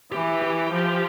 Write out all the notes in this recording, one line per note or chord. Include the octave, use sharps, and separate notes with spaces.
E3 G4
G4
F3